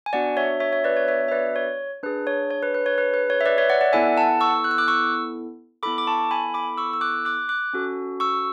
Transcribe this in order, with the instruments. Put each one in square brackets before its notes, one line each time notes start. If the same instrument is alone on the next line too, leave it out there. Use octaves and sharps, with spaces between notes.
[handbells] G#5
B3 D4 F#4 D5 F#5
C#5 E5
C#5 E5
C#5 E5
B4 D5
C#5
C#5 E5
E5
B4 D5
C#5
D4 G#4 B4
C#5
C#5
B4
B4
C#5
B4
B4
C#5
E5
B4 D5
C#5 E5
D5 F#5
D5 F#5
B3 E4 A4 E5 G#5
F#5 A5
C#6 E6
F#6
E6
D6 F#6
C#6 E6
B3 E4 A4 B5 D6
D6
A5 C#6
G#5 B5
B5 D6
C#6 E6
E6
D6 F#6
D6 F#6
D6 F#6
C#4 F#4 A4
C#6 E6